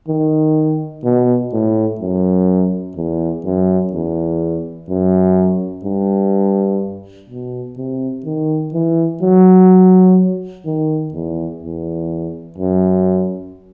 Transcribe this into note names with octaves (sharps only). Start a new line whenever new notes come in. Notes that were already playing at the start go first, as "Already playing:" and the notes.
D#3
B2
A2
F#2
E2
F#2
E2
F#2
G2
B2
C3
D#3
E3
F#3
D#3
E2
E2
F#2